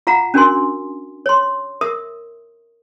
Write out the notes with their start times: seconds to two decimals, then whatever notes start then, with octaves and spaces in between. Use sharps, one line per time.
0.07 F4 F5 F#5 A#5
0.34 C#4 D4 F#4 A#4 G#5 C6
1.26 C#5 C6
1.81 A#4 E5 D#6